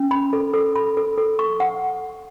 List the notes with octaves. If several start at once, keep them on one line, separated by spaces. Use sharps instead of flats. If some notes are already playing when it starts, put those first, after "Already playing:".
Already playing: C#4
B5
A4
A4
B5
A4
A4
C#6
F#5